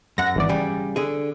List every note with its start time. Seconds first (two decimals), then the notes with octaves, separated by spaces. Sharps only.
0.18 F#2 F#5 A#6
0.36 G#1 E3 D5
0.49 C#3 G3
0.96 D3 G#4